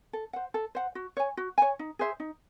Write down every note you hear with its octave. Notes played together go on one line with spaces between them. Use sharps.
A4
C5 F#5
A4
C5 F#5
F#4
C#5 G#5
F#4
C#5 G#5
D#4
G#4 C5 E5
D#4